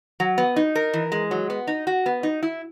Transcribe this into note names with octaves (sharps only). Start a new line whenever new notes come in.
F#3
B3
D#4
A#4
E3
G#3
F#3
B3
D#4
F#4
B3
D#4
E4